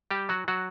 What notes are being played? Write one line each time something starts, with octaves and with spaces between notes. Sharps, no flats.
G3 G4
F#3 F#4
F#3 F#4